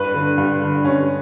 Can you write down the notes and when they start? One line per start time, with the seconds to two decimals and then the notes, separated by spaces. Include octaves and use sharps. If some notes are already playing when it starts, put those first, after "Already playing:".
Already playing: G2 B4
0.14 D3
0.38 G2
0.61 D3
0.84 G2 C#4